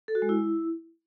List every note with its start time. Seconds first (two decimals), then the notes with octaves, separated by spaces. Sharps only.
0.08 A4
0.15 F#4
0.22 G#3
0.29 E4